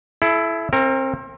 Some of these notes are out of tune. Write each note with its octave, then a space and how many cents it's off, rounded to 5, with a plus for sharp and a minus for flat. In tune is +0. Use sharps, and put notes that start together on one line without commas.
E4 +10 A4 -35
C4 +30 A#4 -20